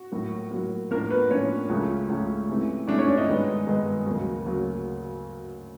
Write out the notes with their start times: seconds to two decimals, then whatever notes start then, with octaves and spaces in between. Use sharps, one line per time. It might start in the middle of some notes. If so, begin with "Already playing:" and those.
Already playing: F#4
0.12 A2 F#3 A#3
0.51 A2 F#3 A#3
0.91 A2 F3 A#3 D4 A#4
1.11 B3 B4
1.30 A2 F3 A#3 C#4 D4 C#5
1.69 C#2 C#3 F3 A3 C#4
2.09 C#2 C#3 F3 A3 C#4
2.48 C3 E3 A3 C#4
2.88 C3 E3 A3 C#4 D4 D5
2.98 C#4 C#5
3.08 D4 D5
3.18 D#4 D#5
3.27 G2 D#3 G#3 B3
3.67 G2 D#3 G#3 B3
4.06 D2 C#3 F#3 A#3
4.46 D2 C#3 F#3 A#3